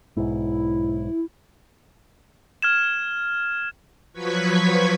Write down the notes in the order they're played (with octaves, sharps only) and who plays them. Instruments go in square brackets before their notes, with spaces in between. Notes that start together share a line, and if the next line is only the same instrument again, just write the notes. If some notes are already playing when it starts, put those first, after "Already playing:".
[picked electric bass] B1 G#2 [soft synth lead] E4
[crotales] F6 G#6 E7
[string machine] F3 F#3 B4 C#6 G#6 B6